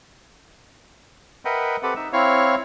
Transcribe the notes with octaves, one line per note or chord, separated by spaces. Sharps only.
A#4 B4 D#5 E5 F#5 G5
C4 G4 A4 B4 F#5
D#4 E5 E6
C4 E4 C#5 F5